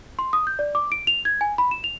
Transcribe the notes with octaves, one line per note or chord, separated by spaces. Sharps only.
C6
D#6
G6
D5
D6
D7
F7
G#6
G#5
B5
E7
F7